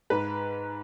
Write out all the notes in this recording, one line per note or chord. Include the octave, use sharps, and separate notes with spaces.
G#2 B4